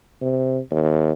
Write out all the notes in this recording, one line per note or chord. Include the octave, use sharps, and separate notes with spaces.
C3
D#2